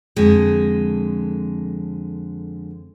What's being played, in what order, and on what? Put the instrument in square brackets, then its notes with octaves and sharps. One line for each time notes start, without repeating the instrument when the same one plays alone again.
[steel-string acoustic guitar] F2 D3 G#3